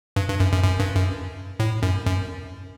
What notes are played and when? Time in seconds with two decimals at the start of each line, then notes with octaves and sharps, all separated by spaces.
0.16 G2
0.28 G2
0.40 F#2
0.53 F#2
0.64 F#2
0.80 G2
0.96 F#2
1.60 A2
1.83 F#2
2.07 F#2